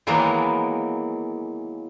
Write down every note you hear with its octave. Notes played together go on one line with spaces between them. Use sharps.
D#3 E3 F#3 G#3 A#3 B3